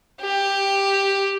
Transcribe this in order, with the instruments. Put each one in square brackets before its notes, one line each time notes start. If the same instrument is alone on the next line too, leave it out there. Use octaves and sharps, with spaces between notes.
[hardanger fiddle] G4